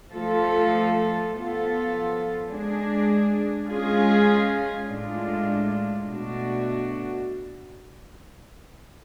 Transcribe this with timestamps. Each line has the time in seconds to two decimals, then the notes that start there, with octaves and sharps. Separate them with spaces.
0.12 F3 A3 F4 A4
1.31 F3 B3 F4 A4
2.50 G#3 D4 G#4
3.68 G#3 C#4 F4 G#4
4.87 A2 G#3 D4 F4
6.06 B2 A3 D4 F#4